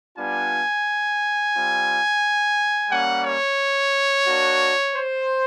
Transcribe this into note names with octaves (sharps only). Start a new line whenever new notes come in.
G3 B3 D4 F4 G#5
G3 C4 F4
G3 A#3 C#4 F#5
C#5
A#3 D4 F#4
C5